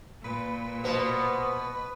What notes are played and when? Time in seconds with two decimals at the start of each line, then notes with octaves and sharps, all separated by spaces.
0.24 A#2 B4
0.84 B2 B3 C5